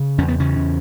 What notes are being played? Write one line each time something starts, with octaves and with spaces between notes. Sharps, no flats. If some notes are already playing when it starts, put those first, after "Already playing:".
Already playing: C#3
E2 C#4
B3
C#3 C#4
C#3